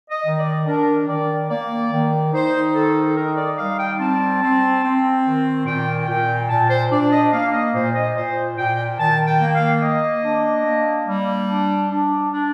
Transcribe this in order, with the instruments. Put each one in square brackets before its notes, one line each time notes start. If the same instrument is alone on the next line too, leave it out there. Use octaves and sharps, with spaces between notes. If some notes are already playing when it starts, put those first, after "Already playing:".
[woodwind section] D#5
D#3
D5
D4 A#4
D#3 D5
A#3 D5
D#3
D#4 C5
D#3 A4
D#4 A#4
D5
G3 F5
G5
C4 A5
C4
C4
D#3
A#2 G5
A#2 G5
A#2 A5
C5
D4 D5
D#5
A#3 F5
D#5
A#2 C5
D#5
A#2 C5
A#2 G5
D#3 A5
G5
A#3
F5
A#3 D#5
D4
A#3
G3
D4
D4
D4